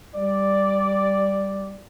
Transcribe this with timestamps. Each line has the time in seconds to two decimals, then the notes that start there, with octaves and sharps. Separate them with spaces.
0.15 G3 D5